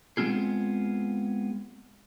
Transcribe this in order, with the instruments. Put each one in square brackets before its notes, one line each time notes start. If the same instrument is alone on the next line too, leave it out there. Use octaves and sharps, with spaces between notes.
[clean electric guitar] G#3 B3 C4 F4 G#4